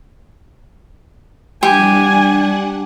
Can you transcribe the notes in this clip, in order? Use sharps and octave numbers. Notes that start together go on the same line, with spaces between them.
G3 D4 G4 F#5 G#5